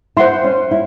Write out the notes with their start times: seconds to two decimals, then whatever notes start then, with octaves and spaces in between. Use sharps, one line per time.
0.17 E4 C5 F#5 C6
0.44 C#4
0.71 E4